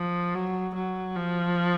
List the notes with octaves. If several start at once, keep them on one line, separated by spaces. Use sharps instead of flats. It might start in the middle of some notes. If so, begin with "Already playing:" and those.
Already playing: F3
F#3
F#3
F3